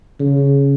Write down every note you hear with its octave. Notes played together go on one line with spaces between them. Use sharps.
C#3